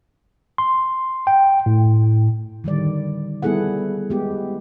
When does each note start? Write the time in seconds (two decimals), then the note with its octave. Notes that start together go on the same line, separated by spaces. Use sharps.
0.58 C6
1.27 G5
1.66 A2
2.64 D3 D#3 G3 D5
3.42 G3 B3 E4 G#4 A4 F#5
4.10 G#3 B3 G4